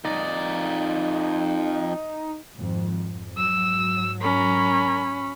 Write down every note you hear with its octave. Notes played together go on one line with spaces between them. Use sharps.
F2 D#4 D5
G#1 F2
G#2 F#3 E6
C#4 A#4 B5